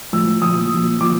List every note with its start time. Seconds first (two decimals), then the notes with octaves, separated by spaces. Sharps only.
0.13 A2 F3 E6
0.42 A#2 F3 D#6
0.71 A#2 F3
1.00 A#2 F3 D6